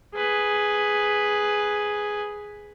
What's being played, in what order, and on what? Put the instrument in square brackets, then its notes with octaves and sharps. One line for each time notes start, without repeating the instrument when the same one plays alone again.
[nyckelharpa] G#4 B4